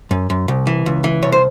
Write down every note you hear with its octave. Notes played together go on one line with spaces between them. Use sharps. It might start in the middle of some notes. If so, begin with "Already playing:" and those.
F#2
F#2
C2
E3
C#2
E3
C2 C#5
C5